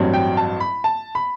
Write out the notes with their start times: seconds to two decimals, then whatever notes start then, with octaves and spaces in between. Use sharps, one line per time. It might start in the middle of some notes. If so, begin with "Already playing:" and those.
Already playing: A1 G2 F#3 C4
0.13 G5
0.37 A5
0.60 B5
0.84 A5
1.15 B5